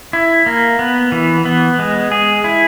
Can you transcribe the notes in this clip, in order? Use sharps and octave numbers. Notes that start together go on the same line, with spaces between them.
E4
A#3
B3
E3
B3
G#3
G#4
E4